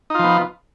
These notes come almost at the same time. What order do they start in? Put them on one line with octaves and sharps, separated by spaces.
D#4 F4 F3 B3